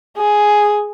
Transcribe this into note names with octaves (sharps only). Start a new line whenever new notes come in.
G#4